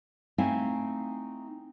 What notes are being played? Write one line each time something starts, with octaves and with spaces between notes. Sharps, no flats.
A3 C4 D#4 E4 F5 G#5